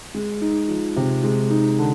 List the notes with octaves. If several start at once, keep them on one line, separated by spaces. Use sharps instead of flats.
G#3
D#4
F3
C3
G#3
D#4
D3